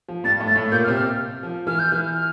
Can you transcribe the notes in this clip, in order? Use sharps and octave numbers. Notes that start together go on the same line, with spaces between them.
F3
G2 G3 A6
A2 A3
A6
A2 A3
A#2 A#3 G6
F6
C3 C4
F6
F3
E3 F6
G6
E3 F6
F6